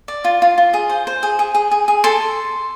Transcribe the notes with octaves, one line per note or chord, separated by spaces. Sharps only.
D5
F4
F4
F4
G#4
C5
C5
G#4
G#4
G#4
G#4
G#4
A4 C6